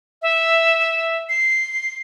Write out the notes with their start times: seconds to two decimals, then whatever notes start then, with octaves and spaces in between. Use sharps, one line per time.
0.22 E5
1.29 C7